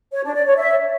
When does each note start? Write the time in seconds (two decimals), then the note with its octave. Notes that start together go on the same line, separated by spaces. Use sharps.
0.13 C#5
0.24 D4
0.35 D5
0.46 C#5
0.57 E5